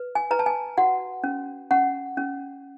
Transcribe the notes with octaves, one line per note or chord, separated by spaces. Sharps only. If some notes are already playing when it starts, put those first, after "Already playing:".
Already playing: B4
G#5
B4 A#5
A5
G#5
F#4 F#5
C#4
C#4 F#5
C#4